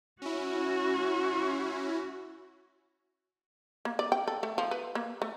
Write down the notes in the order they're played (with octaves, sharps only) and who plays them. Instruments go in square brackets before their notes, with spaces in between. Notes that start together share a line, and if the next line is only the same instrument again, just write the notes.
[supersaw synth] C#4 E4 [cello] F#4
[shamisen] A#3
D5
G5
A4
A3
F3
B4
A#3
A3